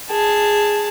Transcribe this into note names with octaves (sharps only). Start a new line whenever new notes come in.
G#4 A5